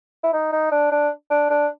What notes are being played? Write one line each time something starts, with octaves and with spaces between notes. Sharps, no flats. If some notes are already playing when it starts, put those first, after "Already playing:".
E4
D#4
D#4
D4
D4
D4
D4